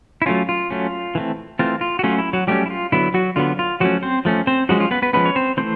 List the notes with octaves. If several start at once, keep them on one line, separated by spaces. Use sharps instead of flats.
E4
F#3 A3 C#4 F4
F4
F#3 A3 C#4
E3 A3 C4
E3 A3 C4 F4
F4
F#4
F#3 A3 C#4 F4
E4
F#3 F#4
F#3 G3 A3 C#4 G4
E4
F4
D3 F#3 B3 E4
F#3 F#4
D3 F#3 B3 F4
F4
F3 F#3 A3 C#4 F#4
C4 C5
F3 A3 C#4
C4 C5
F3 F#3 G#3 C#4 F#4
F4
B3 B4
B3 B4
F3 G#3 B3 C#4 B4
C#5
C4 C5
E3 A3 C4 C5